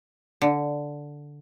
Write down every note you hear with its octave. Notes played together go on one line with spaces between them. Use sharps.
D3